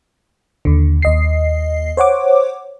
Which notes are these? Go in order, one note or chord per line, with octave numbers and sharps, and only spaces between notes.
D#2 D3
D#2 D#5 C7
C5 C#5 F#5 D6